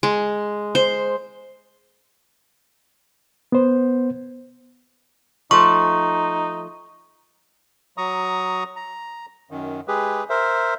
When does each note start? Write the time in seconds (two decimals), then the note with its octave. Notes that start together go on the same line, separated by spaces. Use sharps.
0.03 G#3
0.75 C5
3.52 B3 C5
5.51 F3 A3 D#4 C#6
7.98 F#3 A#5 C#6 D#6
8.76 A#5
9.51 F#2 D#3
9.88 G#3 G4 G#4 B4
10.30 A#4 C5 E5